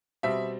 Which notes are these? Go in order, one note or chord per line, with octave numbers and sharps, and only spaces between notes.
B2 G3 C4 E5